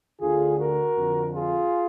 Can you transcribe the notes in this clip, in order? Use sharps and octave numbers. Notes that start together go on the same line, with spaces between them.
D2 D3 F4 G#4
F#4 A#4
F2 D3
F4 G#4